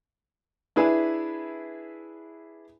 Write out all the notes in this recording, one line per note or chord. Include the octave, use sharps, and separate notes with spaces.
D4 E4 G#4 B4